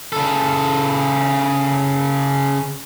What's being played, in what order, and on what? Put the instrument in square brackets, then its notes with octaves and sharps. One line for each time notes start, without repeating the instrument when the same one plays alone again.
[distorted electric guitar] C#3 A4